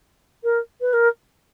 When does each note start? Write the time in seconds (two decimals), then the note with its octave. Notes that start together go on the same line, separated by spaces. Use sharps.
0.43 A#4
0.80 B4
0.93 A#4